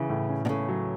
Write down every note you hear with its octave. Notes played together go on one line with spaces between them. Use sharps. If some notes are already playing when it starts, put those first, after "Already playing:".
Already playing: C#3 E3
A2
C#4
B2
C#3 A3
F#3